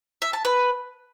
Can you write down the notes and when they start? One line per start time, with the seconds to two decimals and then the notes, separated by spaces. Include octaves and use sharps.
0.22 E5
0.33 A5
0.45 B4